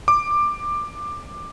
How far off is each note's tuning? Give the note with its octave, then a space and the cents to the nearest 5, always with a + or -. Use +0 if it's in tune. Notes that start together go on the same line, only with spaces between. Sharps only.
D6 +15